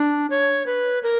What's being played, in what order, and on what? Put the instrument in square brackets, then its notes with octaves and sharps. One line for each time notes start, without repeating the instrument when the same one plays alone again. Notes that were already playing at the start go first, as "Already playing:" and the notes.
Already playing: [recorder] D4
C#5
B4
A#4